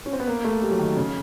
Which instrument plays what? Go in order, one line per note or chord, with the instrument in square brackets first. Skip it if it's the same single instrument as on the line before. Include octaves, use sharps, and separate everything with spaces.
[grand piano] C#4
C4
B3
A#3
A3
G3
F#3
D#3
C#3